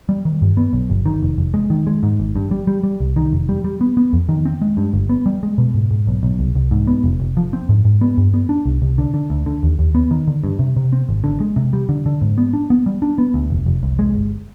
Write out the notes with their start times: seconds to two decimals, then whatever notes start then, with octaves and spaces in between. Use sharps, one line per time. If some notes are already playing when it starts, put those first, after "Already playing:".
0.09 G3
0.25 D#3
0.42 G2
0.57 B3
0.73 B1
0.90 G1
1.06 D#3
1.22 F1
1.38 F1
1.54 G#3
1.70 D#3
1.87 G#3
2.03 G#2
2.20 G#1
2.36 G2
2.51 G3
2.67 G3
2.83 G3
3.00 C2
3.16 D#3
3.33 F1
3.49 G3
3.64 G3
3.81 B3
3.97 B3
4.13 F2
4.29 D#3
4.45 C4
4.62 G#3
4.77 G2
4.94 G1
5.09 B3
5.26 G3
5.43 G#3
5.58 B2
5.74 G#2
5.91 G#2
6.07 B1
6.23 B1
6.39 C2
6.55 C2
6.71 G#2
6.87 B3
7.04 F1
7.20 F1
7.37 F3
7.53 C4
7.69 G#2
7.85 G#2
8.01 B3
8.18 G2
8.34 B3
8.49 D4
8.66 C2
8.82 C2
8.98 D3
9.14 D3
9.30 D2
9.46 D3
9.63 D#2
9.79 D#2
9.95 B3
10.11 D#3
10.27 D3
10.44 G2
10.59 C3
10.76 C3
10.93 C4
11.09 G#1
11.24 D3
11.40 G#3
11.56 C3
11.73 G3
11.89 D3
12.06 D3
12.21 G#2
12.38 B3
12.53 D4
12.70 B3
12.86 G3
13.02 D4
13.18 B3
13.34 D2
13.50 F1
13.66 F1
13.83 C2
13.99 G#3
14.15 G1